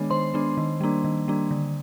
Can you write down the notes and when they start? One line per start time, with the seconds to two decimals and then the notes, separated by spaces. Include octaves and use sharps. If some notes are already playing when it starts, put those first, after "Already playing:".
Already playing: D#3 G#3 B3 D4 C#5
0.10 D#3 C5 C6
0.34 G#3 B3 D4
0.57 D#3
0.81 G3 A#3 D4
1.04 D#3
1.28 G3 A#3 D4
1.51 D3